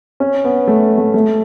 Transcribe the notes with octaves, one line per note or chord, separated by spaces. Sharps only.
C#4
B3
A3
A3
A3